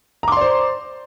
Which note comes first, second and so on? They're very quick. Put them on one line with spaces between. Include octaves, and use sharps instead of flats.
A#5 D6 C6 D5 C5